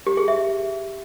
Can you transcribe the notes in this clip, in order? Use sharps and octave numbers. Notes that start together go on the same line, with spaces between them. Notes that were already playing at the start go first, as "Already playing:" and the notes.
G4
G#4
E5